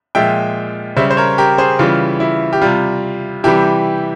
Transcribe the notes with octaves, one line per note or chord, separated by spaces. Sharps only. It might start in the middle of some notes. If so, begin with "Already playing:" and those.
A#2 F3 G#3 E5 G5
C#3 G3 C5 E5
C5
A#4 C#5
G4 A#4
G#4 C5
C#3 E3 G3 F4
E4
G4
C3 G3 F4
C3 E3 G3 E4 G4